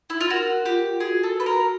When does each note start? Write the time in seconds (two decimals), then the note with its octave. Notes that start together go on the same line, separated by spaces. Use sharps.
0.10 E4
0.21 F4
0.30 F#4 A#4
0.65 F4 G4
1.00 F#4 G#4
1.23 A4
1.34 F#4
1.40 B4
1.46 A#4